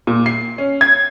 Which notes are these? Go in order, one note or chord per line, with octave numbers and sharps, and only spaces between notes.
A#2
C7
C#4
G#6